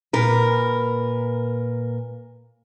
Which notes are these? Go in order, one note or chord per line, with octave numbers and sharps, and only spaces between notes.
A#2 A#4 B4